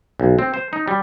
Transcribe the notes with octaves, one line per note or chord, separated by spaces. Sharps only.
B1
C4
C5
D#4
G3